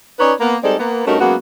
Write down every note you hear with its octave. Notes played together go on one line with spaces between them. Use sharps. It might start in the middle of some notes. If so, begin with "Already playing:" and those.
C#4 D#4 B4 C#5 D5
A#3 B3
G3 G#3 C4 D#4 A4 D5
A#3 B3
G2 A3 C#4 D#4 F#4 A#4
F#2 G#3 A#3 B3 F#4